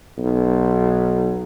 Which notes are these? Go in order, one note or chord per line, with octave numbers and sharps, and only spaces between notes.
B1